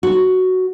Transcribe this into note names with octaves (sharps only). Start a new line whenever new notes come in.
F#4